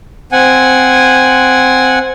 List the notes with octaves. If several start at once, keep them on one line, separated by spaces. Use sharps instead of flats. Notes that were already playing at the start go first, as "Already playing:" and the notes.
C4 F#5 G#5